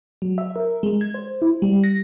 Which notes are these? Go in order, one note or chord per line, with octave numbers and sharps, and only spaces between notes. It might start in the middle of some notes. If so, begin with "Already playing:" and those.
F#3
E5
A#4
G#3
G#6
C5
E4
G3
A#6